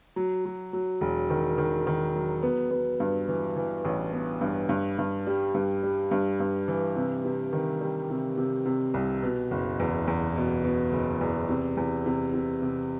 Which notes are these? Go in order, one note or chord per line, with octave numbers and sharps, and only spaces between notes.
F#3
F#3
F#3
E1
D#3
D#3
D#3
F#3
B3
B3
G2
E3
E3
A1
B3
G2
G2
G2
G3
G2
G3
G2
G2
E3
C3
C3
D#3
G3
C3
C3
C3
C2
B2
F#1
E2
E2
B2
B2
F#1
E2
C3
E2
C3
C3
C3